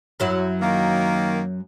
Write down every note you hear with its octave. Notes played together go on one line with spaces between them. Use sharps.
F#2 F#3 E4
D#3 A#3